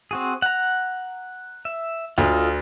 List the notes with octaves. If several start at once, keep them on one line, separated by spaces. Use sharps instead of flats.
C4 F#4 G#4
F#5 A#5
E5
D2 F4 A4 D#5